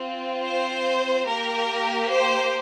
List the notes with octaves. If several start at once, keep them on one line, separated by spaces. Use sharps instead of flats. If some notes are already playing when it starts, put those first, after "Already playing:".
Already playing: C4 F4
C5
A#3 G4 A#4
C5